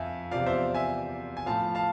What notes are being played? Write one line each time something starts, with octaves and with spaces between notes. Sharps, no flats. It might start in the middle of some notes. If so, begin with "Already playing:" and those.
Already playing: F2 E5 F5 G#5
E2 C3 F3 D5 F5
C5 E5
E5 G#5
G#5
A2 F3 F5 A5
F5 A5